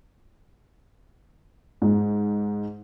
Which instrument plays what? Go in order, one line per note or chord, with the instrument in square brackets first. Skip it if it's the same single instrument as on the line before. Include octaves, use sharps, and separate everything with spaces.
[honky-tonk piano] G#2